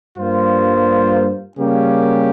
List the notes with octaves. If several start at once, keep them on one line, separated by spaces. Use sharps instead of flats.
G2 G3 A#3 F4 C5
C#3 G3 A#3 C#4 G4